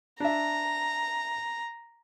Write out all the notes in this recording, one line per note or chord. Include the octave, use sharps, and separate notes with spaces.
D4 E5 A#5